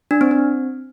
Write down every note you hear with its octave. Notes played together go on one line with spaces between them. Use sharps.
D4
C4
C4